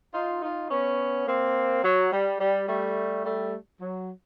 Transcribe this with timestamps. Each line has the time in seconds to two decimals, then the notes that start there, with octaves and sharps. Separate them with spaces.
0.14 D#4 F4
0.42 D#4 F4
0.70 B3 C#4
1.27 A#3 C4
1.84 F#3
2.12 G3
2.40 G3
2.68 G3 A3
3.25 G3 A3
3.81 F#3